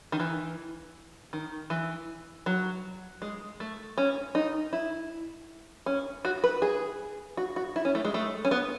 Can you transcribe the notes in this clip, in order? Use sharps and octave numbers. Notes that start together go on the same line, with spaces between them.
D#3
E3
D#3
E3
F#3
G#3
A3
C#4
D#4
E4
C#4
F#4
B4
G#4
F#4
F#4
E4
C#4
A3
G#3
A3
C#4
B3